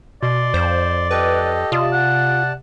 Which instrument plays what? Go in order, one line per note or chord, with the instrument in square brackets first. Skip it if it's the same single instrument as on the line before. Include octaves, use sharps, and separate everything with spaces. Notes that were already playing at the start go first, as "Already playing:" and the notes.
[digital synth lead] B2 [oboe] D5 [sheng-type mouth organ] C6
[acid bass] F2 [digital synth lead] C5
[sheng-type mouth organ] G4 A4 D#5 [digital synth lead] B4
[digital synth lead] C3 [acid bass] F4 [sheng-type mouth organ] D5 A5 [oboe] D#5
[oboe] F#5